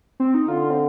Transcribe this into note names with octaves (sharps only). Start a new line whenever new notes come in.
C4
D#4
D3 F4
C4